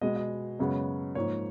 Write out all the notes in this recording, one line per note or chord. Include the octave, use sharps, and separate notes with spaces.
B2 G#3 B3 D#5
D#5
F#2 C#3 G#3 B3
G#2 F3 A#3 C#5